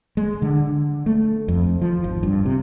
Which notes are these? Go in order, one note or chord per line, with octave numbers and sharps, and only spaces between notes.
G#3
D3
A3
F2
F3
G#1
G2
C3